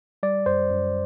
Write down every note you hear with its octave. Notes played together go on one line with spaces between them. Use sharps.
G3 D5
F#2 C5
F#2